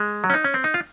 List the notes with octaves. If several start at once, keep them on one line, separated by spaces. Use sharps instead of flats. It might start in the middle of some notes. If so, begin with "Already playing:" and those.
Already playing: G#3
F#3
C#4
D#4
C#4
C4
D#4
F4